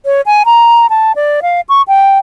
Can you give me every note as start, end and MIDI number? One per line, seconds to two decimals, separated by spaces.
0.05 0.21 73
0.26 0.43 80
0.46 0.86 82
0.90 1.12 81
1.16 1.40 74
1.42 1.61 77
1.69 1.82 85
1.88 2.18 79